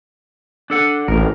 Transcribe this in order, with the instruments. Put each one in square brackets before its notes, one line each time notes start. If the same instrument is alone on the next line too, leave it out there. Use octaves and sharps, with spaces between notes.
[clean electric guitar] D4 A4 F#5
[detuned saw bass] A1 [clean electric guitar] A#4